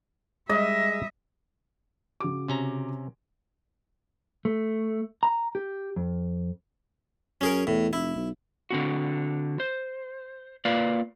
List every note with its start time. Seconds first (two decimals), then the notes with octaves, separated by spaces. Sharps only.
0.49 G3 G#3 D#5 E5
2.20 C#3 F#4 D6
2.48 C3 C#4 A#5
4.45 A3
5.23 A#5
5.55 G4
5.96 F2
7.41 F#2 C#4 G#4 A#4
7.67 E2 A2
7.93 F1 E4
8.16 B1
8.70 D3 C4 F#4
9.60 C5
10.65 A#3 F4 B4 D5 F5